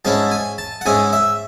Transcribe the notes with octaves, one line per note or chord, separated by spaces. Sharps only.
G#2 G#3 C#4 E4 A5
G#5
A5
F#5
G#2 G#3 C#4 E4 G#5
E5